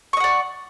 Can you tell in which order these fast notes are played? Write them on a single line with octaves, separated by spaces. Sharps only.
C#6 D#5 F#5 D5